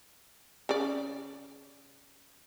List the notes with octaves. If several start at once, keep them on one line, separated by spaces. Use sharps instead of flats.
C#3 D5